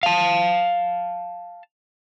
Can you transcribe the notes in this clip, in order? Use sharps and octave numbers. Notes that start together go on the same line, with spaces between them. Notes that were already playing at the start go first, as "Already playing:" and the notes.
F5 A5